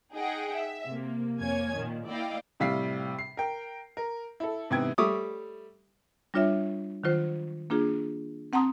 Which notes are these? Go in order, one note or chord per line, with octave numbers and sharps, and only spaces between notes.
D#4 G#4 D#5 F#5 G5
E5
C3 A#3
F2 A#3 C#5 G#5 G#6
A#2 D#3
A#3 E4 D5 D#5 F5 G5
A2 C3 G3 F5 B6 C7
C7
A#4 G5
A#4
E4 A4
G#2 C3 E3 B3 G5 G#6
G3 A3 C#5 E5 D6 D#6
G3 D4 F4 C#5 E5
D#3 F#3 F4 C5
A#3 D4 F4 G#4
C4 F#5 A5 A#5 C6 D#6